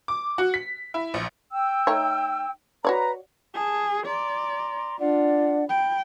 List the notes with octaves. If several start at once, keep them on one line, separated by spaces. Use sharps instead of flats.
D6
F#4
B6
E4
A#1
G5 E6
A3 D#4 C#5
F#4 B4 C#5 D5 A#5
G#4 A5
D5 A#5 C6
D4 F4 D5 F#5
G5 B5